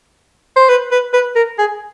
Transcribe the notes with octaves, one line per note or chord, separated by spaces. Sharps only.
C5
B4
B4
B4
A#4
G#4